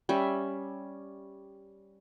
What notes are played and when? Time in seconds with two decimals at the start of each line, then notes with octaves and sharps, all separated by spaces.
0.09 G3 C#4 E5